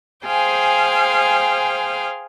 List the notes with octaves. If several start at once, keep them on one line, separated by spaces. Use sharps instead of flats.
G#4 C5 F5 G5 G#5